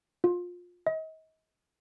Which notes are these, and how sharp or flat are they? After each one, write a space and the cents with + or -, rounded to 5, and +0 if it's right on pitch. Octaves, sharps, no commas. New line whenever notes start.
F4 +25
D#5 +35